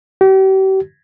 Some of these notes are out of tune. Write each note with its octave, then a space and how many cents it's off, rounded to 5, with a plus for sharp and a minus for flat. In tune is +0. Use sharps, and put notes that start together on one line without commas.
G4 -40